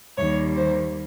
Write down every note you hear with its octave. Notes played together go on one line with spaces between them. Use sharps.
D#2 D#3 G3 A#3 C#5
C5